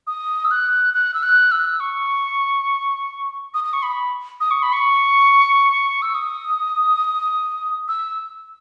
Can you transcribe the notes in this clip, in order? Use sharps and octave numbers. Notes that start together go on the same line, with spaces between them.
D#6
E6
F#6
F#6
E6
F#6
E6
C#6
D#6
D#6
C#6
B5
D#6
C#6
B5
C#6
E6
D#6
E6